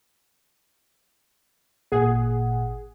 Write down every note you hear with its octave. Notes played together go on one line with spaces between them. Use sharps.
G#1 A#2 G#4 F#5